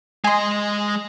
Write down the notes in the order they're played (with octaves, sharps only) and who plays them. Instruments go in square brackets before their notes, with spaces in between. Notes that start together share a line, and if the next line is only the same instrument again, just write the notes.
[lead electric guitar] G#3 D#5 [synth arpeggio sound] G#5 C6